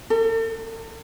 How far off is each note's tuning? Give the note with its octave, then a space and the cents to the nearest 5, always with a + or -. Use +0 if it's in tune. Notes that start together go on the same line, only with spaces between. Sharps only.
A4 +45